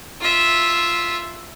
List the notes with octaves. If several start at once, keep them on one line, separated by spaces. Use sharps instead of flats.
F4 E5